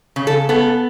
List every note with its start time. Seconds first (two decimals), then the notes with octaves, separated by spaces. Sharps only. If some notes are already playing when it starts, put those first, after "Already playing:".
0.16 C#3
0.27 A4
0.49 B3 A4